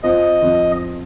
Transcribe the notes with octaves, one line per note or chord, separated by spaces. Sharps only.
F2 F3 C4 D#5
F2 F3 C4